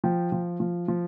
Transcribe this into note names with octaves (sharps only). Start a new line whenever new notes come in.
F3 G5
F3
F3
F3